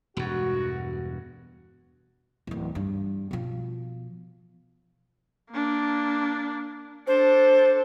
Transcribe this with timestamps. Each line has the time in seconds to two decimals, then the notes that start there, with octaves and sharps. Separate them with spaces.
0.17 E1 G2 F#4
2.47 D1 E3
2.75 G2
3.31 B2 F3
5.50 A#3 D4
7.07 D4 A4 C5